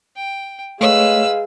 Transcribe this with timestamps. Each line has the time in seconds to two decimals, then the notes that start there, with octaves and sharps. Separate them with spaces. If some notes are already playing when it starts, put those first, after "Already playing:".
0.16 G5
0.81 G#3 A3 B4 C#5 F5 E6